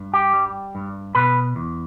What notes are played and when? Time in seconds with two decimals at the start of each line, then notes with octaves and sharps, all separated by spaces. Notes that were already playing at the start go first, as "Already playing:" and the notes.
Already playing: G2
0.14 G4
0.33 G3
0.75 G2
1.15 B2 B4
1.56 E2